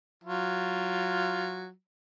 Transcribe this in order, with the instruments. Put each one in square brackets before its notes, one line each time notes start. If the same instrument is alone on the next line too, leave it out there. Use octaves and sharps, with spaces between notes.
[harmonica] F#3 F4